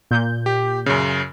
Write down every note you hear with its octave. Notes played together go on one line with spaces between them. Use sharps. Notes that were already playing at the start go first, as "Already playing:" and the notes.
A#2 G6
G4
F#2 C#3